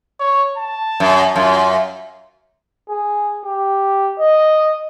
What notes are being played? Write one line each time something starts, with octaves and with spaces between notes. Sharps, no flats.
C#5
A5
F#2
F#2 F4
G#4
G4
D#5